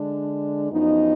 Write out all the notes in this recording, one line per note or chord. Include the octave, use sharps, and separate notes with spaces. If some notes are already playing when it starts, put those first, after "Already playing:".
Already playing: D3 G#3 D4
F#2 F3 B3 D#4